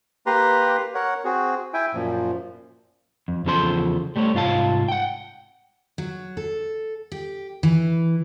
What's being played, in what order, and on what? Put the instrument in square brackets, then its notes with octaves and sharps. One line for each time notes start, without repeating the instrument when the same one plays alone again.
[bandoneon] A#3 G4 B4 A#5 C6
A#4 C#5 F#5
C4 F#4 G#4
E4 E5 G5 G#5
F#2 A#2 F3
[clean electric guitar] F2
E2 C#3 F3 A4 C5 C6
G3 A3 C5 C#5
C2 G#2 F4 F5 A5
F#5 G5
[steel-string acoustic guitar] F#3
A4
G4
E3